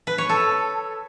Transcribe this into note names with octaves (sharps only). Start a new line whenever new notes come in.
B4
C#5
A4